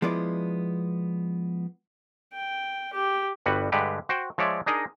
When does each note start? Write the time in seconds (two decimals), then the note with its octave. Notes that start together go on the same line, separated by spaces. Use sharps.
0.02 F3 G#3 B3 E4 D5
2.34 G5
2.93 G4
3.46 G1 G3 F#4 B4 F#5
3.72 G2 D3 G#3 G4 B4 F#5
4.09 F#4 C5 G5
4.38 F3 G#3 C#5 D5 E5
4.66 D4 D#4 G#4 A#4 D#5